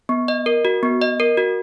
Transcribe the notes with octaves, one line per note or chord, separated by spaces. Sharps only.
B3
D#5
A#4
F#4
B3
D#5
A#4
F#4